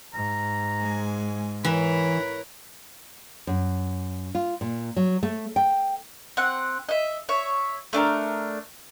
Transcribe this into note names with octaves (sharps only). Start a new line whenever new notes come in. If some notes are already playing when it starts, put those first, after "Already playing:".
G#2 A#5
G#3 G#5
E3 A#4 C#5 B5
F#2
F4
A#2
F#3
A3
G5
C4 F#5
D#5 E5
C#5 E5
A3 D4 A4 A#4